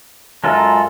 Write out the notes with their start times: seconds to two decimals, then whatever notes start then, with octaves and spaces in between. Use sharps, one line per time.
0.44 F#2 G#3 F4 A4 A#5